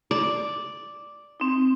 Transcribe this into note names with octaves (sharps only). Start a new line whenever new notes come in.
D5
C4 D#4